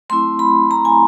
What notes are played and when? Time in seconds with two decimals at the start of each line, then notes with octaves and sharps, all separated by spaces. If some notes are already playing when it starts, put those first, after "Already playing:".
0.10 F#3 A3 C4 E4 C6
0.39 B5
0.71 A#5
0.85 G#5